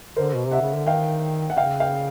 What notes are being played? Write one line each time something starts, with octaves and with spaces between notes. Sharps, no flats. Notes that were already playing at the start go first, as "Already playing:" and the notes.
D3 A#4 C5
B2
C3 E5 F#5
C#3
D3
D#3 F5 G5
F#5
C#3 F5 G5
F5 G5